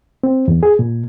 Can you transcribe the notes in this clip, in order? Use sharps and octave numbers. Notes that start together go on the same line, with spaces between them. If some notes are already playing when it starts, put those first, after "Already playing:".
C4
E2
G#4
A#2